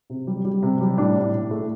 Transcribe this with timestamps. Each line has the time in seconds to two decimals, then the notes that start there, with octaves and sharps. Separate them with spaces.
0.10 C3
0.27 G3
0.45 G3
0.63 C3
0.81 G3
0.97 A2 D4
1.16 A2
1.33 A2
1.51 A3